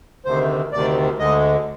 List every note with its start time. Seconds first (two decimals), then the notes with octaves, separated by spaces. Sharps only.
0.25 D2 C3 D#3 C5
0.72 D2 C3 D#3 D5
1.19 D2 D3 G#3 D#5